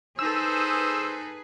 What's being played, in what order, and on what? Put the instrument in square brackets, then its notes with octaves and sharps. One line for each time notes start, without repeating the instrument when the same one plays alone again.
[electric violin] D#4 A4 [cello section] G#4 B4 [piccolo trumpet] C5 [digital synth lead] E6